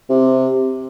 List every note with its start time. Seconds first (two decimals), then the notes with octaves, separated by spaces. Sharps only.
0.09 C3